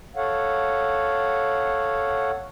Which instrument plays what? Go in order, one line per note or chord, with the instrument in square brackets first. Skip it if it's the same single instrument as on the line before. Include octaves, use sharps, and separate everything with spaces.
[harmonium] A4 C#5 F5 F#5